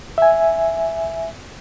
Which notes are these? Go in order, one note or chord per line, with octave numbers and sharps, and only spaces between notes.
E5 G#5